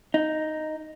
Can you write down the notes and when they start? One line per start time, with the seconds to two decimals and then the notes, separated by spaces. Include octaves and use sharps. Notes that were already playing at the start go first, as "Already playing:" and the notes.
0.14 D#4